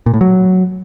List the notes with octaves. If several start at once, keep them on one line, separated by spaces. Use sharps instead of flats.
A#2
A2
F#3